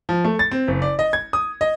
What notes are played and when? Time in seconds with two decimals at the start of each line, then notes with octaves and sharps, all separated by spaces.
0.09 F3
0.24 A3
0.39 A6
0.51 C4
0.68 F#1
0.82 D5
0.99 D#5
1.13 G#6
1.33 D#6
1.61 D#5